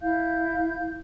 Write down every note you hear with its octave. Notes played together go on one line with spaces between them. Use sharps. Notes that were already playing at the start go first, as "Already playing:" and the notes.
E4 F5 G6